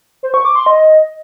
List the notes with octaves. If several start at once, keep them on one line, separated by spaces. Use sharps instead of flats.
C5
C#6
D6
C6
D#5